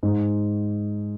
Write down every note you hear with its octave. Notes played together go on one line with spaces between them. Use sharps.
G#2